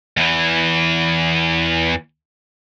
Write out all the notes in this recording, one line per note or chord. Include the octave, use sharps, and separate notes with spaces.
E2 E3